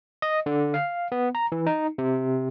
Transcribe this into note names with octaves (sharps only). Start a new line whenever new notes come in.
D#5
D3
F5
B3
A#5
E3
D#4
C3